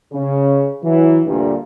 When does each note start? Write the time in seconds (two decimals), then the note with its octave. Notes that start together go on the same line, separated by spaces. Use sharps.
0.13 C#3
0.83 E3 F#3
1.26 D2 G2 A#2